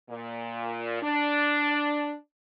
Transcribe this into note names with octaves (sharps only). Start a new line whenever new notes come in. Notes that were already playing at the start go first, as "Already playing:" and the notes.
A#2
D4